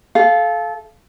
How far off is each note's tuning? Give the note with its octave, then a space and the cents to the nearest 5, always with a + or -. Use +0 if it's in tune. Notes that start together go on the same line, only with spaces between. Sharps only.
A4 -25 F5 +0